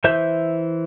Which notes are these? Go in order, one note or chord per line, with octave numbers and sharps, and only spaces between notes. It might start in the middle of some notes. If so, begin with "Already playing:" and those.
E3 C5 E5 G6